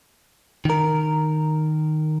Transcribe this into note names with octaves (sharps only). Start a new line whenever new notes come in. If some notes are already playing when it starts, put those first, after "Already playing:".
D#3 A#4